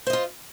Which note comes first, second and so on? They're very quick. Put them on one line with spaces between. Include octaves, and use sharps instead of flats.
C5 D#5 F4